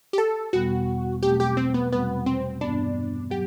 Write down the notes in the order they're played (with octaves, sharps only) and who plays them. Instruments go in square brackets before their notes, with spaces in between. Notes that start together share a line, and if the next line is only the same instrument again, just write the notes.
[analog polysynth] G4
A4
[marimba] E2 B2 G3 B3 [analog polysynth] F#4
[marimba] B2 F#3 A3 C4 [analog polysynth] G4
[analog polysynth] G4
C4
B3
[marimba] E2 C3 G3 C4 F#4 [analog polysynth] B3
[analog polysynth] C4
[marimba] G2 E3 B3 [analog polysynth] D4
[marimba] F#3 [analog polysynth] G4